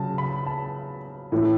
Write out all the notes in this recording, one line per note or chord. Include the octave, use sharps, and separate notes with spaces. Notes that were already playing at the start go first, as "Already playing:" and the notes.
Already playing: C#3 F#3 A5
B5
A5
A2 E3 A3